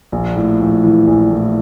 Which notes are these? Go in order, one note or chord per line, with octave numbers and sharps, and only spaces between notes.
A#1
A2
A#1
E3
A#1
A2